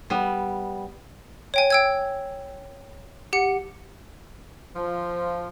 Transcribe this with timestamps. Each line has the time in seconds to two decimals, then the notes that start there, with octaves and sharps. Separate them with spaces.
0.10 G3 B3
1.54 C#5 G5 G#5
1.70 G5 E6 G#6
3.33 G4 F#5 C#7
4.75 F3